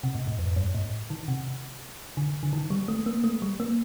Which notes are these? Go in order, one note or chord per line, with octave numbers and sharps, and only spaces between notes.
C3
A2
A2
F2
G2
A2
D#3
C3
D3
D3
D#3
G3
A3
A#3
A3
G3
A#3